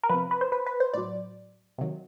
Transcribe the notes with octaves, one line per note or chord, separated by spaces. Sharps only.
A#4
C3 F3 B4
B4
C5
B4
B4
C5
A2 F#3 D5
C3 D#3 F#3